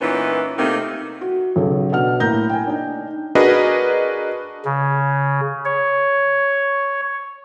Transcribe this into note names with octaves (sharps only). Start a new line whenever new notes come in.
A#2 E3 B3 C#4 D#4
C3 A3 A#3 C4 D#4
F#4
B1 C#3 A4
B2 D4 F#5 F6
A2 A#3 A#5 G6 A#6
G5 G#5
D4 D#4
D4 F#4 G#4 A#4 B4 D#5
C#3
C#5